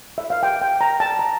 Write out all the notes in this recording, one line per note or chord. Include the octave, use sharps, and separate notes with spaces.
E5
F5
G5
G5
A#5
A5
A#5